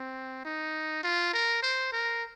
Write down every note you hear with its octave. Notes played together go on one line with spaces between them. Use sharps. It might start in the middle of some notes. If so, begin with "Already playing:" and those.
Already playing: C4
D#4
F4
A#4
C5
A#4